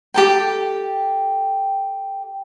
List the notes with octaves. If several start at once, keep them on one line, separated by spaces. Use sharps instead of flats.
G4 A4 G5